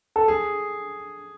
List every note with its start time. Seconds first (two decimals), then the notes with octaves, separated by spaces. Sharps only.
0.16 A4
0.28 G#4